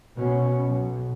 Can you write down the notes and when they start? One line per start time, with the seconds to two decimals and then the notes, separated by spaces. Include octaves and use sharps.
0.15 B2 C#4
0.66 B1 B2